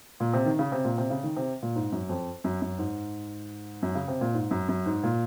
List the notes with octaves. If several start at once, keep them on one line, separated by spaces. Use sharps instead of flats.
A#2
C3
D#3
C#3
C3
A#2
C3
C#3
D#3
C3
A#2
G#2
F#2
F2
F#2
F#2
G#2
F#2
C#3
C3
A#2
G#2
F#2
F#2
G#2
A#2